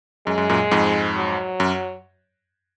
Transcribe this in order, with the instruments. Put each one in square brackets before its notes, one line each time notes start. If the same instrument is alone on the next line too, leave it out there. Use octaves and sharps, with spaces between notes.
[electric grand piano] F#2 [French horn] G#3
[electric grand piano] F#2
F#2 A#2
F2 G#2
[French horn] F#3
[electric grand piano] F#2